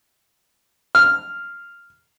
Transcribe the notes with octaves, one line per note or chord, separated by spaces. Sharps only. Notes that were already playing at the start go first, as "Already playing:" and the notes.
F6